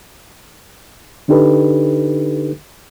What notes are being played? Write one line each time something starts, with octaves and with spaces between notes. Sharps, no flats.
D3 D4 D#4 G4 A4 B4